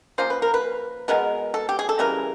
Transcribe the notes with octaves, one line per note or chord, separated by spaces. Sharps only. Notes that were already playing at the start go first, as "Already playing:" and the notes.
F3 A#3 C#4 C5
B4
A#4
B4
B2 G#3 B3 A#4
A4
G4
G#4
A4
C#3 E3 G3 A#4